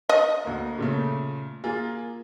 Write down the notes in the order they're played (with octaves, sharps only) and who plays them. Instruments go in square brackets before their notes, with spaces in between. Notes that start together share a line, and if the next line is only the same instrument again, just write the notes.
[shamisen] D#5
[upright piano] D2 A#3
A#2 C#3 A3
A#3 F4 G#4